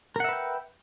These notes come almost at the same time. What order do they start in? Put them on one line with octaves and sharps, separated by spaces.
A#4 F#5 E5 B4 G5